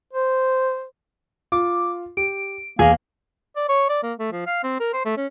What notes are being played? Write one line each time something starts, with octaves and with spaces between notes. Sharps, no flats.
C5
F4 D6
G4 D7
E2 A#3 G#4
D5
C#5
D5
A#3
A3
F3
F5
C4
A#4
C5
A3
C#4